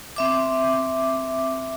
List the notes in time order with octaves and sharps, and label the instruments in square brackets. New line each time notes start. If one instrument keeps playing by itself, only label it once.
[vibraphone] C4 E5 D6